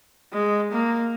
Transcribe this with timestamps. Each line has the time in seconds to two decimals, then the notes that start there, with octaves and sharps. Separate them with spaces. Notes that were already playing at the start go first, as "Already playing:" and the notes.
0.33 G#3
0.72 A#3